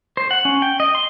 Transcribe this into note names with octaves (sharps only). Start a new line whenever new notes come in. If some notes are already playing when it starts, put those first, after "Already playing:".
C5
F#5
C#4
G5
D#5
C6